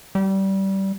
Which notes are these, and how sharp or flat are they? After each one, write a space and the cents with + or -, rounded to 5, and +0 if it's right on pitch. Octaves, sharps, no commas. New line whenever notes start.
G3 -20